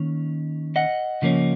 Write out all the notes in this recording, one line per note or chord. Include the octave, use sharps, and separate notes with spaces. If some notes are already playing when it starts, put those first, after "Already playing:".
Already playing: D#3 A#3 C#4
D#5 F#5
C#3 F3 A#3 C#4